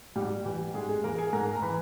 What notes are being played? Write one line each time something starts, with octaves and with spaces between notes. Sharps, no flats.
G#2 G3 G4
E3 G3 G4
G#2 G#3 G#4
G#3 G#4
E3 A#3 A#4
G#4 G#5
G#2 A#4 A#5
A#5
E3 B4 B5